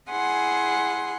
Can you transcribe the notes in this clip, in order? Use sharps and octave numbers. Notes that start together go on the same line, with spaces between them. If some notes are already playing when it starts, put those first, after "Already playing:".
E4 G#4 F#5 G#5 C6